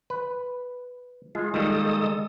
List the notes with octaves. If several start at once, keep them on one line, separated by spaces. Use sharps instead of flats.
B4
G#3 F4
D#3 G3 G#3 A#3 A4 D#6